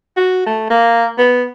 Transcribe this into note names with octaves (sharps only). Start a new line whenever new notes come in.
F#4
A3
A#3
B3